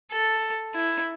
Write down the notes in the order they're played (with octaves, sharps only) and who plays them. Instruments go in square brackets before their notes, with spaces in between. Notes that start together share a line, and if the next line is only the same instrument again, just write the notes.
[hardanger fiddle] A4
E4